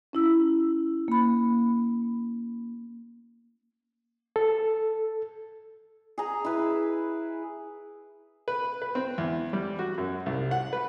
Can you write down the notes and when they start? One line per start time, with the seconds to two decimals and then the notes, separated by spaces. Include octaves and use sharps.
0.13 C#4 E4 E6
1.08 A#3 B5
4.36 A4
6.18 G#4 A#5
6.44 E4 B4
8.48 B4
8.82 B4
8.95 C4
9.18 E2
9.53 G3
9.79 F#4
9.98 F#2
10.26 C2
10.51 F#5
10.73 B4